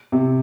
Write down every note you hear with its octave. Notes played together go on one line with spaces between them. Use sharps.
C3